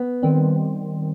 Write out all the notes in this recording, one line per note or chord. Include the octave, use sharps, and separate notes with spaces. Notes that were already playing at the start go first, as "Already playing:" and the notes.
Already playing: B3
D#3 G3 C4